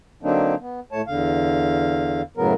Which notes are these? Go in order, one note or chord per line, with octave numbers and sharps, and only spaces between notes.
D3 F#3 A#3 C4 D4 D#4
B3
A2 A3 C#5 A5
E2 D3 F5
F#2 A2 C#3 F#3 B3 A#4